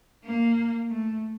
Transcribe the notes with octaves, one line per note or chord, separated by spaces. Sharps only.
A#3
A3